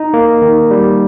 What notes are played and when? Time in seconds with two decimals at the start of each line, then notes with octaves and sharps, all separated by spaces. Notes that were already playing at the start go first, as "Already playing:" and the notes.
Already playing: D#4
0.14 A#3
0.42 D#3
0.71 G3